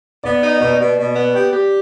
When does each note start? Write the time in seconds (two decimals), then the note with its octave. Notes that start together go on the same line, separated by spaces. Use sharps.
0.24 B3 D5
0.43 D#4
0.60 B2 D5
0.80 B2
0.98 B2
1.15 B3
1.35 G4
1.52 G4